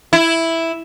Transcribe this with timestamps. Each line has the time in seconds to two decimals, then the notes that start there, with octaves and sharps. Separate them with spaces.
0.13 E4